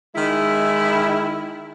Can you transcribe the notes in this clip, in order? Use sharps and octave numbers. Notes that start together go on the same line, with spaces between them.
D#3 G#3 E4